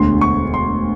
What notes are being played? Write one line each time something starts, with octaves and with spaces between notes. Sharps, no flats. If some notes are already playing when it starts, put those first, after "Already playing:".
Already playing: E1 D2 D3 C6
C#6
C6